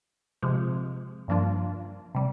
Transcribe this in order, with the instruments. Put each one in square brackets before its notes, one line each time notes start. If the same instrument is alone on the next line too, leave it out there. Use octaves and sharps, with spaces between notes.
[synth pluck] C3 F3 G#3
G2 F3 A#3 D4 F4
C3 G3